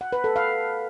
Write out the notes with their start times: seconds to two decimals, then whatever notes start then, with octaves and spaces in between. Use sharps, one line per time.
0.01 F#5
0.13 B4
0.24 A4
0.36 F5